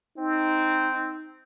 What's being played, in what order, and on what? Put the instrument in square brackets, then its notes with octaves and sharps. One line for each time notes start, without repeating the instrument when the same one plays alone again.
[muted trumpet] C4 [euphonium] D#4